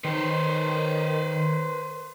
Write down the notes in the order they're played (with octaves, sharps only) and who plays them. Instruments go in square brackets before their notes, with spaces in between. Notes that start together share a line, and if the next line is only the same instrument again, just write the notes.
[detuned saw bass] D#3 [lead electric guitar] B4 C5